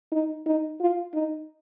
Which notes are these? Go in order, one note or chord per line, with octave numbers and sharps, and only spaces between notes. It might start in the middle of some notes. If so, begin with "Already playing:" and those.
D#4
D#4
F4
D#4